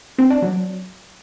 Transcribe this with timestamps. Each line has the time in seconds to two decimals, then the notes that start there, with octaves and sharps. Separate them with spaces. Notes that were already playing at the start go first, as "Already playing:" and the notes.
0.18 C4
0.30 D4
0.42 F#3